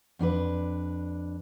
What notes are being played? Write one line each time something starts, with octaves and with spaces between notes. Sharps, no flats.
F2 D4 F#4 B4